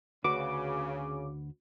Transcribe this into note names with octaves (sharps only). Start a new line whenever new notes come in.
D2 C#3 F#4 B4 D6